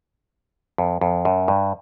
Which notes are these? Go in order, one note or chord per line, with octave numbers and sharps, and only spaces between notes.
F2
F2
F#2
G2